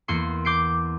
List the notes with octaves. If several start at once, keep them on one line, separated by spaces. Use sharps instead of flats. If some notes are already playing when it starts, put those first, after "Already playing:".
E2 A#3 C6 C#7
D6 G6 C7 D7